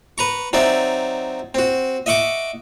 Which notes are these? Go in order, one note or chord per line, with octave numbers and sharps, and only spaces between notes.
B4 A#5 C#6
F#3 C4 D#4 D5 E5
C4 F#4
D#5 E5 F#5 C#6 D6